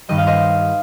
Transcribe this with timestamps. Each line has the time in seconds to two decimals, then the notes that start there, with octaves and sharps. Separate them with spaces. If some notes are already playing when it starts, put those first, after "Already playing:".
0.09 G2 D#3 G3 D#5
0.18 F5
0.27 C5 D#5